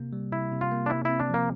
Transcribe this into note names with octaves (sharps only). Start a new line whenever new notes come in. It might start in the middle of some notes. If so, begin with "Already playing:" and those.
Already playing: C3 A#3
G3
C3 E4
C3
F4
A#3
D4
C3 E4
C4 E4
D4
F3 A#3